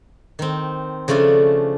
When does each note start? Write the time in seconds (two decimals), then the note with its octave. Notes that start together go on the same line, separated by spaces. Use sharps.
0.39 D#3 C4
1.08 C#3 F3 A3 C#4 D4